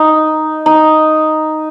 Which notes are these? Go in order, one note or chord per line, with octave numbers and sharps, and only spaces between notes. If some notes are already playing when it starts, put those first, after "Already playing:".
Already playing: D#4
D#4